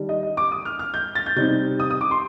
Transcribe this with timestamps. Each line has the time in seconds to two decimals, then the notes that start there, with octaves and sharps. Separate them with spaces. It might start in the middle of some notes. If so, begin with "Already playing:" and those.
Already playing: D#3 G3 D4
0.09 D#5
0.23 D#5
0.37 D6
0.52 D#6
0.65 F6
0.79 F6
0.94 G6
1.15 A6
1.26 G6
1.36 C3 G3 C4 D#4 G6
1.80 D#6
1.90 D#6
2.01 D6
2.11 C6